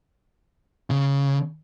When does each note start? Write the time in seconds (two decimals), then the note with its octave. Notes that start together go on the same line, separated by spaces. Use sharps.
0.91 C#3